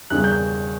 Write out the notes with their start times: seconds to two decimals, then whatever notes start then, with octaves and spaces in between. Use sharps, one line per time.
0.10 E2 C#3 G3 F#6
0.24 G6